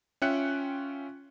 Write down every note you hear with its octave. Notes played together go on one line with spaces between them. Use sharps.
C#4 F4 E5 G5 F#6 C#7